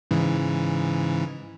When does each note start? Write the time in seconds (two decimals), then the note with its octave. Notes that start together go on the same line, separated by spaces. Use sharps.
0.11 G#2 C#3 E3